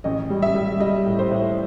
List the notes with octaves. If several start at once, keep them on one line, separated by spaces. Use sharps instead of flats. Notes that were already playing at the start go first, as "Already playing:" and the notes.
A1 D#5
G3
E5
G3
G3 D#5
A2
C5
A2